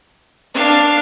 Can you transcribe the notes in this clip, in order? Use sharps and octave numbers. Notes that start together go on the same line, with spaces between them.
D4 F5